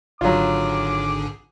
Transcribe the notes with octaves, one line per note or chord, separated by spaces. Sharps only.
G#1 D3 F#3 F4 G#4 D6